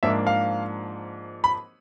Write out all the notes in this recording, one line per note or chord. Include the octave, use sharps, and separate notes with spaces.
G#2 F3 A#3 D4 E5
F5
B5